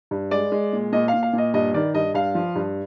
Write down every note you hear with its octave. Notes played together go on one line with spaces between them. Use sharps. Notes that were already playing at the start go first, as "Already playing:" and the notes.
G2
G#3 D5
G#3
A#2
A#2 D#5
F5
A#2
F5
A#2 D#5
G2 D#5
D#3 D5
G2 D#5
G2 F5
F3
G2